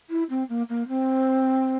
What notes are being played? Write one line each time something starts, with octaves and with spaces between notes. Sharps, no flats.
E4
C4
A#3
A#3
C4